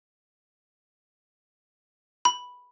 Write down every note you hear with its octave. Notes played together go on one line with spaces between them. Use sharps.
B5